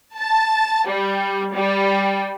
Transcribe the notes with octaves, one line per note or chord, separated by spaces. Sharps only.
A5
G3
G3